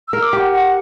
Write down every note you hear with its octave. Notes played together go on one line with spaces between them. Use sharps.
E6
A#4
D6
G4 F#5
F#5